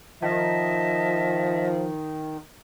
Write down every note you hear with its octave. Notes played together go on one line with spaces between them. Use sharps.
D#3 F3 D#5 E5 A5